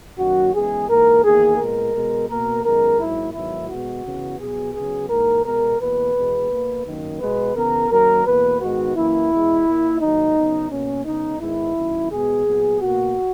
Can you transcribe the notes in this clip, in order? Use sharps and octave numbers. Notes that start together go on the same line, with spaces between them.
F#2 D#3 F#3 A#3 F#4
F#2 E3 G#3 B3 G#4
G#2 E3 A#3 A#4
E2 D#3 A#3 G#4
A#2 G#3 B3 A#4
B2 G#3 B3
B2 A#3 A#4
F#2 D#3 G#3 B3 A#4
G#2 F#3 A#3 E4
G#2 D#3 F#3 B3 E4
B2 G#3 B3 F#4
C#3 E3 B3
B2 F#3 B3 G#4
C#3 F#3 B3 G#4
G#2 E3 A#3 A#4
B2 G#3 B3 A#4
E2 B2 A#3 B4
E2 B2 G#3
B2 A#3
F#2 D#3 A#3
B2 G#3 B3 B4
C#3 E3 B3 A#4
F#2 D#3 F#3 A#3 A#4
E2 B2 A#3 B4
G#2 D#3 G#3 B3 F#4
F#2 E3 A#3 E4
E2 B2 G#3
A#2 A#3
G#2 D#3 F#3 A#3 D#4
C#3 F#3 B3
B2 A#3 C#4
C#3 G#3 B3 D#4
G#2 D#3 G#3 B3 E4
F#2 D#3 A#3
B2 G#3 B3 G#4
A#2 F#3 B3
B2 A#3 F#4